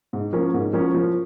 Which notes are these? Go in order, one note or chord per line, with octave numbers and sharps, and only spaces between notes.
G#2
F3 A#3 C#4
G#2
F3 A#3 C#4
F3